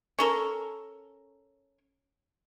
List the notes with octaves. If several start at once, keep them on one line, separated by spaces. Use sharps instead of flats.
C#4 A4 A#4